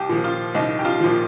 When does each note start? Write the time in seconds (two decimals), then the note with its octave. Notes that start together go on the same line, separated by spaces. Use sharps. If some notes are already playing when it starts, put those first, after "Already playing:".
Already playing: C2 G4
0.09 A#2 F3
0.24 F4
0.55 C2 D#4
0.79 G4
0.85 F4
1.00 A#2 F3